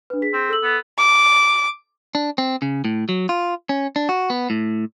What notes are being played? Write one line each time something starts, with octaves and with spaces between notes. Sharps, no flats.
D4 B4
G#4 B6
C4
A4 E6 F#7
B3
D6
D4
C4
C#3
A2
F#3
F4
C#4
D4
F#4
B3
A2